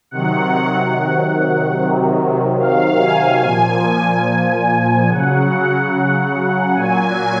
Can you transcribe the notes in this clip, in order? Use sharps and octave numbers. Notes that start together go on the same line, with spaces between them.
C3 D#3 F#3 F#5
C3 D#3 F#3
F5
G#5
A#2 F3 G#5
C#3 F#3 F#5
A#2 F#3 G#5